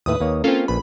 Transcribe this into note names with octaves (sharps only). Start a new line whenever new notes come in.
D#2 A2 B4 E5 D#6
D#2 A#3 C#5
A#3 C4 C#4 F4 A4
A#1 B4 B5